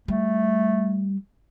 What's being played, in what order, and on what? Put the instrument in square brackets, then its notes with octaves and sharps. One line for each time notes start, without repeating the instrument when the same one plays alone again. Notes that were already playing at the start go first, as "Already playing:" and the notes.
[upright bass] G3 [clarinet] A3